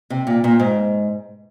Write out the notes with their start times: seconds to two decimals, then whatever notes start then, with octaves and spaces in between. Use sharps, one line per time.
0.10 C3
0.27 A#2
0.44 A#2
0.59 G#2